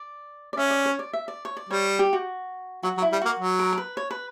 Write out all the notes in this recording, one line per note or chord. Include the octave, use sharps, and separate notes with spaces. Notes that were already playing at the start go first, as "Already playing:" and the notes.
Already playing: D5
D5
C#4 E5
D5
C#5
D5
E5
D5
C#5
D5
G3 C#5
G4
F#4
F#3 F#4
F#3
E4
G3
A#3 F#4
F#3
A#4
A#4
B4
C#5
B4